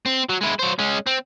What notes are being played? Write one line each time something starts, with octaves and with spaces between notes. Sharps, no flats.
C4
F#3
G#3 E4
F#3 C5
G#3 C#4
C4